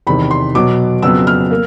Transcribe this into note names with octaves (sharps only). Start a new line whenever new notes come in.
E2 C3 D#3 B5
C6
B2 F#3 B3 D6
F2 C#3 F#3 B3 E6
F6
A#3